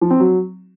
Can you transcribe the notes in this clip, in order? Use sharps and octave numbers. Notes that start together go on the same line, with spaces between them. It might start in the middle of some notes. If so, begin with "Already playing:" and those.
F3
C4
F#3